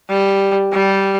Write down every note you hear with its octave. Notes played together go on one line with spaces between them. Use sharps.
G3
G3